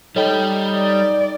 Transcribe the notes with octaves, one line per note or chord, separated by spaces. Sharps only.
G3 D#4 A4 C#5 D#5 G5
D5